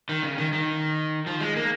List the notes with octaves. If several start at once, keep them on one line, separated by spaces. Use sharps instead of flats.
D#3
C#3
D#3
D#3
F3
G#3
A#3